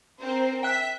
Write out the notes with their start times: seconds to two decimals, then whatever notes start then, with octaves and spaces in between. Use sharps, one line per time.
0.19 C4 A#4 C5
0.63 E5 G5 F#6 B6